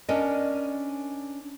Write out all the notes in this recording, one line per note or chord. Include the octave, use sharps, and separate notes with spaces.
C#4 D4 A#4 D5 D#5